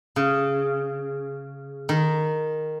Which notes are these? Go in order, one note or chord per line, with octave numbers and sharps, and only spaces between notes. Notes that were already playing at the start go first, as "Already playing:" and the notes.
C#3
D#3